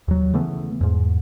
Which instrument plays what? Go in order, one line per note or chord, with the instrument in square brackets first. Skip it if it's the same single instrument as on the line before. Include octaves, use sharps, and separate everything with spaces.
[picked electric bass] D#2 F#3
C#3 E3 A3 B3
E2 G#2